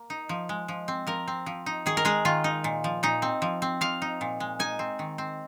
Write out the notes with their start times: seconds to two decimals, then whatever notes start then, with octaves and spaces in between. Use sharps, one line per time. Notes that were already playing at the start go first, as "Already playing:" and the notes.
Already playing: A#3
0.10 D#4
0.29 F3
0.49 G#3
0.68 F3
0.88 C4
1.07 F3 A#4
1.28 C4
1.46 F3
1.66 D#4
1.86 D#3 G#4
1.97 A#4
2.05 G#3 G#4
2.25 D#3 F4
2.44 D#4
2.64 A#2
2.84 F3
3.03 A#2 D#4
3.22 C4
3.42 F3
3.62 C4
3.81 F3 F5
4.02 D#4
4.21 A#2
4.40 G#3
4.59 D#4 G#5
4.79 C4
4.99 D#3
5.18 C4